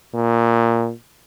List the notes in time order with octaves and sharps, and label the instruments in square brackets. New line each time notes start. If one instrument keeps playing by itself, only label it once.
[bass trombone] A#2